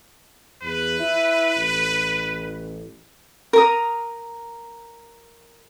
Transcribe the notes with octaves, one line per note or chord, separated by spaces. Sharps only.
E2 B4
E4
A1
A#4 A#5 D#6